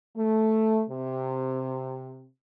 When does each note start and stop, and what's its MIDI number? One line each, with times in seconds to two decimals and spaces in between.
0.17 0.84 57
0.89 2.28 48